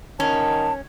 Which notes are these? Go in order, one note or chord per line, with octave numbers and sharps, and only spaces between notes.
D#3 C#4 A5